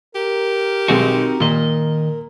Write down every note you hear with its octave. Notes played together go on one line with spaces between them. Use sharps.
G4 A#4
B1 D#3 G#3 C4 D#4 F#4
A#2 D#3 D#5